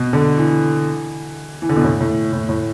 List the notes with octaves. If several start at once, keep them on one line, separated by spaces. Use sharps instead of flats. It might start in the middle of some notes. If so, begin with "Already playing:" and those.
Already playing: B2
D3
E3
E3
D3
B2
A2
A2
A2
A2